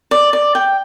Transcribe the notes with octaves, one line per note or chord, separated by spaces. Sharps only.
D5
D5
G5